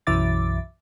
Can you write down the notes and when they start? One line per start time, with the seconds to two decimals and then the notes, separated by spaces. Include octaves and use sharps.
0.07 B1 F#2 E3 E5 D6 A6